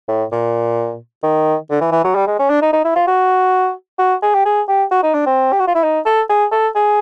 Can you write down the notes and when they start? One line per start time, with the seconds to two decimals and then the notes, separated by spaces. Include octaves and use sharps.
0.08 A2
0.32 A#2
1.23 D#3
1.70 D3
1.81 E3
1.92 E3
2.04 F#3
2.15 G3
2.27 G#3
2.39 C#4
2.49 D4
2.62 D#4
2.73 D#4
2.85 E4
2.96 F4
3.07 F#4
3.99 F#4
4.22 G#4
4.34 G4
4.45 G#4
4.68 G4
4.91 F#4
5.03 D#4
5.14 D4
5.26 C4
5.53 G4
5.60 F#4
5.67 F4
5.75 E4
5.84 D#4
6.06 A4
6.29 G#4
6.52 A4
6.76 G#4